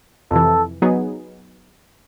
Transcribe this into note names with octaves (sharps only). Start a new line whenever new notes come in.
F2 C3 E3 A4
F#3 B3 D#4 G#4